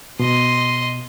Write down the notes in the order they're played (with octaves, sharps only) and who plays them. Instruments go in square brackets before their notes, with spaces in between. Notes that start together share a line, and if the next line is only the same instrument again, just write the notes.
[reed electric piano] B2 [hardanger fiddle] D#5 C6